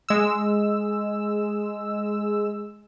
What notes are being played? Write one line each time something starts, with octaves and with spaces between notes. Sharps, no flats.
G#3 E6